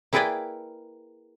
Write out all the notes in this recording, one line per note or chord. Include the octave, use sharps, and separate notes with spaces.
A#3 E4 G#4 B4 D5 G5